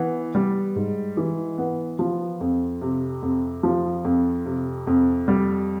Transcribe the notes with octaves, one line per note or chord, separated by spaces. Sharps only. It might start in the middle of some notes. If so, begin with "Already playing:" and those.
Already playing: E3 B3
G3
G#2
E3
B3
F3
F2
C3
F2
F3
F2
C3
F2
G3